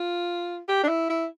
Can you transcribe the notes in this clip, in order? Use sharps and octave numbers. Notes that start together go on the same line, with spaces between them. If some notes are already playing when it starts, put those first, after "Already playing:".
Already playing: F4
G4
D4
E4
E4